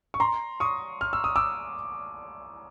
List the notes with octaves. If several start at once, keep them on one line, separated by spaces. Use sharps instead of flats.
C#6
A#5 C6
C#6 D#6
F6
E6
D#6
D6 E6